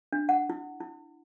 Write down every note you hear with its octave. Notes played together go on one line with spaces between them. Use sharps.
D4
F#5
E4
E4